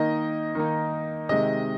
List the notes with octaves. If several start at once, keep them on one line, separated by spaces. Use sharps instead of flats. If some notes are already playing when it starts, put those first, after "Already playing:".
Already playing: D#3 A#3 D#4 D#5
D#3 A#3 D#4
C3 D#3 G#3 D#5